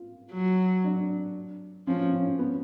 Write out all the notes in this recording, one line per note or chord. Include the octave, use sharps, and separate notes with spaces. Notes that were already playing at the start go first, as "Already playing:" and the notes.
Already playing: F4
F#3
D4
F3 C#4
C#4
B3